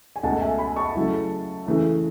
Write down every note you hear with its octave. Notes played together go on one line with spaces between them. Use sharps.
G#5
C#2 B2 A3 F#5 A5
E5 G#5
G#5 B5
A5 C#6
C#3 F#3 A3 E4
C#3 E3 A3 E4